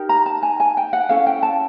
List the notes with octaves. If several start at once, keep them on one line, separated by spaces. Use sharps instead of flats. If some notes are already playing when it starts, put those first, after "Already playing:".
Already playing: D#4 G4 A#4
A#5
A5
G#5
G#5
G5
F#5
C#4 E4 A4 F5
G5
A5